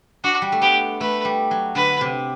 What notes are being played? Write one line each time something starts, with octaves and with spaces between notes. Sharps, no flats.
D4 F#4
G3
A3
B3 G4
A3 B4
G3
F#3
D3 B4
C3